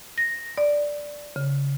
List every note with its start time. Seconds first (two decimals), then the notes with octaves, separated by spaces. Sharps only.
0.18 A#6
0.58 D5
1.36 C#3